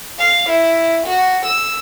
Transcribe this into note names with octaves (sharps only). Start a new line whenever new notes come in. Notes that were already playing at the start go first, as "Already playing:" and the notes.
F5
E4
F#4
E6